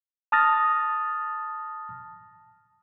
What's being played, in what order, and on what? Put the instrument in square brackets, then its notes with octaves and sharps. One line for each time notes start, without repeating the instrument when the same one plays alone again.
[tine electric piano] A5 D#6 F6 A6 A#6